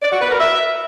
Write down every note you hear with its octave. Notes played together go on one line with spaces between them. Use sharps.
D5
F#4
B4
A#4
E5